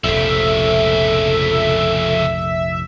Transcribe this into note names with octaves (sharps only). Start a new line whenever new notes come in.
F1 A#1 C#3 F3 A4 E5